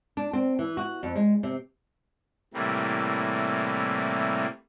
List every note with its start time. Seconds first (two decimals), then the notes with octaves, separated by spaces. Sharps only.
0.17 D4
0.33 C4
0.59 E3
0.77 F#4
1.03 F2
1.16 G#3
1.43 C3
2.54 A2 C3 E3 G3 A#3